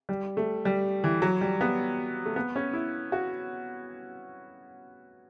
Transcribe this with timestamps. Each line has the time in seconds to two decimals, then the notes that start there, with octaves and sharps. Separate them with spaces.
0.09 G3
0.37 A3
0.65 G3
1.04 E3
1.22 F#3
1.41 G3
1.61 B3
2.25 A3
2.36 B3
2.56 C#4
2.73 E4
3.12 F#4